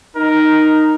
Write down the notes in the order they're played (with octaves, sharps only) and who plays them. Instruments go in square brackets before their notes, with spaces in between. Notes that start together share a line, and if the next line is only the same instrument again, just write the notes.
[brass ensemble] D#4 [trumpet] A#4